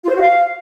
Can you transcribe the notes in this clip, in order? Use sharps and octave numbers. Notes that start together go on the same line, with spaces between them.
F4
C5
F#4
F5